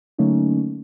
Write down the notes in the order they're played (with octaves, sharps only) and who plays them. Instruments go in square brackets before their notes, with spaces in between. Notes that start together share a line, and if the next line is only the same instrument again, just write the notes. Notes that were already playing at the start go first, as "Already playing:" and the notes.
[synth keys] D3 F#3 A3 A#3 C#4 D#4